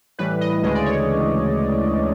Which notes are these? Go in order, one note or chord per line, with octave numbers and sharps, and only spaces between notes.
A2 E3 G3 B4
D#5
D2 C#3 E3 G#3 D#5
D5
C#5